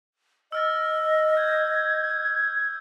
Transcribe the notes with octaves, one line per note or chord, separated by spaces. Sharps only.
D#5 E6 F6 A6
G6 G#6